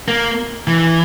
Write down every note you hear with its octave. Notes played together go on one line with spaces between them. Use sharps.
A#3
E3